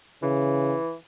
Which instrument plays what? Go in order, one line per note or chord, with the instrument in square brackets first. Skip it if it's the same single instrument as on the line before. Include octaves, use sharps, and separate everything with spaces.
[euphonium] C#3 [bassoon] E3